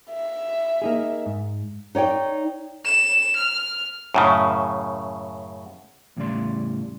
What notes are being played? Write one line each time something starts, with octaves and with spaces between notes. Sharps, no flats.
E5
A#3 D#4 G#4
G#2
D#4 C#5 D5 G5
E7
F6
F#2 A2 C#3
E2 A2 C#3 G3 D5 C6